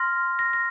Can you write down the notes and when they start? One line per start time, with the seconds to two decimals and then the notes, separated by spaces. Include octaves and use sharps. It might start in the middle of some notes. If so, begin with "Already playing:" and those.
Already playing: C6 F6 A#6
0.39 A#6
0.53 A#6